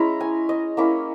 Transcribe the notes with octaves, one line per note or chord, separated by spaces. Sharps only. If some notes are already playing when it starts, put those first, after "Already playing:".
Already playing: G#3 C#4 E4 A#5
G#5
D#5
A#3 C#4 E4